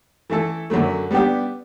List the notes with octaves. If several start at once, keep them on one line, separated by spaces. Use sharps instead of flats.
E3 A3 E4 A4
F#2 D3 F#3 A3
G3 B3 D4 G4